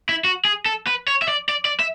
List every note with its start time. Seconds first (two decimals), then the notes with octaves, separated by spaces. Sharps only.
0.09 E4
0.24 F#4
0.45 G#4
0.66 A4
0.87 B4
1.08 C#5
1.22 E5
1.28 D5
1.49 D5
1.65 D5
1.80 E5